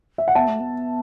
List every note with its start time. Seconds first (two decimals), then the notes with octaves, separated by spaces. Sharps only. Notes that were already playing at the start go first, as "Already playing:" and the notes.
0.18 E5
0.28 F#5
0.35 B3 E5 A5
0.48 A3
0.60 B3